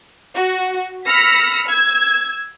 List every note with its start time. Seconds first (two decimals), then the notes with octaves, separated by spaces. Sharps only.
0.35 F#4
1.07 B5 E6 F6 A#6 B6 C#7
1.66 E6 G#6